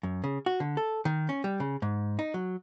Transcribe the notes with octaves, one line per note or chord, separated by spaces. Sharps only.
F#2
C#3
F#4
D3
A4
D#3
C#4
G3
C#3
G#2
D#4
F#3